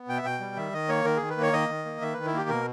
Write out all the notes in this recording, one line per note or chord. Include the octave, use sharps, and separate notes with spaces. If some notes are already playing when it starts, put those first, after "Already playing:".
Already playing: B3
B2 G5
E5
B2 G5
G3
D#3 E5
D#3 D#5
A#3 C#5
D#3 A#4
D#3 G#4
B4
A#3
C#5
D#3 D#5
D#3
A#3
D#3 E5
D#3 B4
E4
A#3 G4
B2 A#4